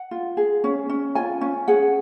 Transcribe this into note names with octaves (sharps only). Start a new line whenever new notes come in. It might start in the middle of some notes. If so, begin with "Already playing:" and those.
Already playing: F#5
F4
G#4
C#4
C#4
F4 G#5
C#4
G#4 F#5